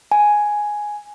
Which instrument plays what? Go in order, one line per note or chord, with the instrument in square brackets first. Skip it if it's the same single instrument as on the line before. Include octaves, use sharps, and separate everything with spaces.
[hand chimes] G#5